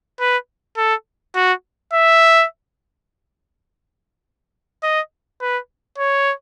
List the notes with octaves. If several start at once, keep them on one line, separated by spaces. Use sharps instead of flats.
B4
A4
F#4
E5
D#5
B4
C#5